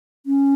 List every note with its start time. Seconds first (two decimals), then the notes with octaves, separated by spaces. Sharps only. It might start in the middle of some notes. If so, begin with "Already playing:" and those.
0.26 C#4